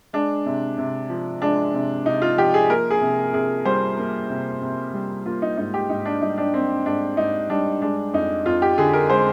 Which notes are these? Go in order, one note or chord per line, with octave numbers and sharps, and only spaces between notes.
G#3 D4
C3
C3
F3
G#3 D4
C3
C3 D#4
F4
F3 G4
G#4
A#3 A#4
G#4
C3
C3 G#4
G3 C5
A#3
C3
C3
G3
A#3 F4
D#4
G#2 D#4
G4
G#2 D#4
D4
G3 D#4
D4
A#3 C4
G#2 D4
G#2 D#4
G3 D4
G#3 D4
F2 D#4
F2 F4
G4
D3 G#4
A#4
G#3 C5